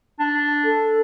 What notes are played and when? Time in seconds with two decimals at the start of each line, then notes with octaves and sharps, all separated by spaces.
0.20 D4
0.64 A4